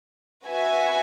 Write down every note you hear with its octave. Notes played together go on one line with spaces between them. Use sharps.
F#4 B4 E5 G#5